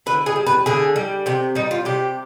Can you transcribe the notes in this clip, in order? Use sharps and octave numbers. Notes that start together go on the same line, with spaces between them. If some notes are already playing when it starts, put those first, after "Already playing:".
D3 B4
G#4
G3
B4
D3 G#4
G3
C3 G4
G3 D#4
F4
C3 G4